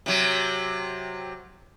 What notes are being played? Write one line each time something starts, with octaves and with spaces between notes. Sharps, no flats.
C3 F#3